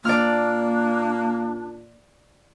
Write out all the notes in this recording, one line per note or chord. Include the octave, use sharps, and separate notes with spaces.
A#2 A#3 D4 D5 F6